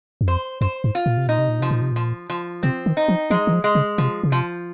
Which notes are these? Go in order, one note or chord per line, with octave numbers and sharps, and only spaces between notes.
F#2
F2 C5
F#2 C5
G#2
F4
A#2
C3
A#2 D#4
C3
A#2
C3 F3
A#2
C3
A#2 F3
F3
C3 C4
D#3
D#4
F3
F3 G#3
D#3
F3
G#3
C#3
C3 F3
C#3
C3 F3